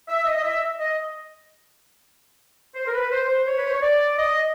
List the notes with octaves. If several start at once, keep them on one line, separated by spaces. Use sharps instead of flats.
E5
D#5
D#5
E5
D#5
C5
A#4
B4
C5
C5
C#5
B4
C5
C#5
D5
D#5